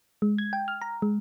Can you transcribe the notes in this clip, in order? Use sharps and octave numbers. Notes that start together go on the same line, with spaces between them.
G#3
G#6
G5
F6
A#5
G#3